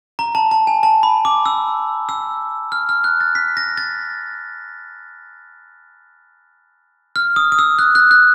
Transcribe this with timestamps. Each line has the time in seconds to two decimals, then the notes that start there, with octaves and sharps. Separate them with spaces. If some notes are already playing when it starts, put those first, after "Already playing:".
0.19 A#5
0.35 A5
0.51 A5
0.67 G#5
0.83 A5
1.03 B5
1.25 D6
1.46 E6
2.09 E6
2.72 F6
2.89 F6
3.04 F#6
3.20 A6
3.35 B6
3.57 A#6
3.77 A6
7.16 F6
7.36 D#6
7.52 D#6
7.59 E6
7.79 F#6
7.95 F#6
8.11 F#6